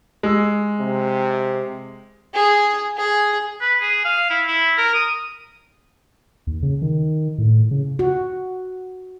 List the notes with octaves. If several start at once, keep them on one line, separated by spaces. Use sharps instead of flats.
G#3 E6
C3
G#4
G#4
B4
G#4
F5
E4
E4
A#4
D#6
D#2
C#3
D#3
A2
C#3
F#4